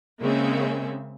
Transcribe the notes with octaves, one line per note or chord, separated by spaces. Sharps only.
C#3 G#3 A#3 C4 C#4 E5